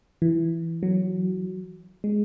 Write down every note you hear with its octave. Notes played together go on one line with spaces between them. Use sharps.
E3
F#3
G#3